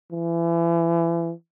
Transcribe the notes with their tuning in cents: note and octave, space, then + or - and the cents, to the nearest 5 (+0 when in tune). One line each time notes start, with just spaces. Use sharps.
E3 +30